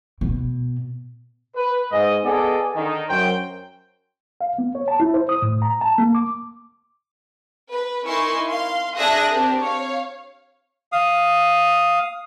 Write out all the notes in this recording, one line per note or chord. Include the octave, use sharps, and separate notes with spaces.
B2
B4
G#2 D#5
B3 G#4 A4 D5 D#5
D3 D#3
F#2 F#3 C5 G5
F5
B3
C#5
A5
E4
C5
D#6
A2
A#5
A5
A#3
D6
B4
D#4 E4 A#4 G#5 C6 C#6
F5 C6
D4 G#4 E5 D#6 F#6 A#6
C4 D4 G4 A#4
C#5 F5
F5 D#6